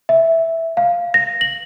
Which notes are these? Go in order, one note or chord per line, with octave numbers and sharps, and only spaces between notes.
E5
F5
A#6
F#7